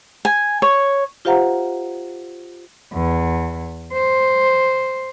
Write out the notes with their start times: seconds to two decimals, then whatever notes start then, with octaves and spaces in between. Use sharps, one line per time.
0.25 G#5
0.62 C#5
1.25 F4 G4 C5 F5 F#5 A#5
2.93 E2
3.93 C5